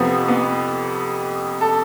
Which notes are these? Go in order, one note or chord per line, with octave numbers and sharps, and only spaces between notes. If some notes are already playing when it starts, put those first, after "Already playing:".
Already playing: F2 C3 F3 B3
B3
A4